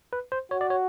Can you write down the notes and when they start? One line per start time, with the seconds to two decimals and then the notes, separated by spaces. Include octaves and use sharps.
0.13 B4
0.32 C5
0.51 F#4 C#5
0.61 D5
0.70 C#5